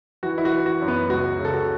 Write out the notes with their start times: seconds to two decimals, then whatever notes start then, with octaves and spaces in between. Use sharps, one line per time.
0.23 E3 F#4
0.38 E4
0.45 F#4
0.52 E3
0.66 F#4
0.81 F#2
0.88 B3 B4
1.09 C#2 F#4
1.39 C#3
1.45 A4
1.53 F#4